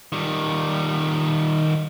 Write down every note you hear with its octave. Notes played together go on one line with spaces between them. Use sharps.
D#3 G3